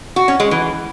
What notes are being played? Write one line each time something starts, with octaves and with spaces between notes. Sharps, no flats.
F#4
C#4
G#3
E3